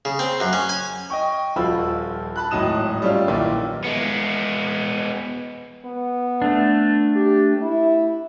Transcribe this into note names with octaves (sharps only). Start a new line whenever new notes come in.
C#3
C4
F#2
C#4
G#5
D#5 G5 C#6
D#1 F3 F4 F#4 B5 E6
A5 B5 F#6
G#1 A2 F#3 D#4 D#6 E7
G3 A3 C#4 F4
B1 A#2 D#3 E3 E4
G#3 B3
B3
A3 D4
G4
E4